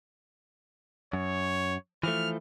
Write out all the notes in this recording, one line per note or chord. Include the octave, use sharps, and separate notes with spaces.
F#2 C#5
E3 F3 A3 F6